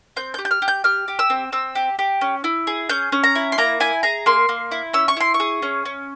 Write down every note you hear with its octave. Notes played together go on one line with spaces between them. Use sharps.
C4 G6
G6
G4
G6
F6
G4
G6
G4 F6
G4
E6
C4
C4 E6
G4
G4
C#4
E4
G#4
C#4 G6
C#4
A#5
E4
C6
A#3 A#5
E4 G#5
G#4 A#5
A#3 C6
A#3
E4
C#4 E6
C#6
E4 C6
C#6
G#4
C#4
C#4